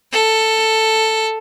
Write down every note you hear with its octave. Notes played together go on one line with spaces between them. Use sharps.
A4